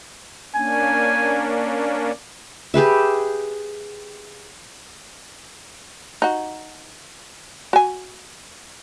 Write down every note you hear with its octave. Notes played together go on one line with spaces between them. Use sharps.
A#3 C#4 D4 G#5
G4 G#4 B4 E5
D#4 F#4
F#4 G#5